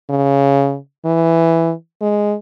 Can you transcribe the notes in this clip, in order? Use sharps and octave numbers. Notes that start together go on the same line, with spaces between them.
C#3
E3
G#3